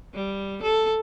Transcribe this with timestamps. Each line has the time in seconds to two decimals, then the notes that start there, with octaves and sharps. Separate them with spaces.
0.15 G3
0.63 A4